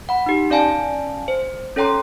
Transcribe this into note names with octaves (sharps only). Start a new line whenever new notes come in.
F#5 B5
D#4 G4
C#4 D5 F5 G#5 A5
C5
C#4 A4 C#5 G5 A#5 C6